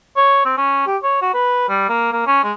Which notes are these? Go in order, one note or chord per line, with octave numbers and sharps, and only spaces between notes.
C#5
C4
C#4
G4
C#5
F#4
B4
G3
A#3
A#3
C#4
G#3